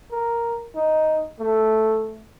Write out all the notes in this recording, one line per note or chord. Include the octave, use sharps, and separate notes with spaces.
A#4
D#4
A3